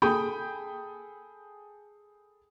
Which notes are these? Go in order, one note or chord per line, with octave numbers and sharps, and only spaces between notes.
G#4 A4 G5 B5 D#6 G6